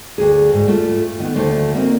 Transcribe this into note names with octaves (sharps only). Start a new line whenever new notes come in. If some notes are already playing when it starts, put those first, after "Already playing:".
D2 G#4
G#2
A3 F4
D#3 B3
D2 D3 A3 C5
A#3 C4 D#4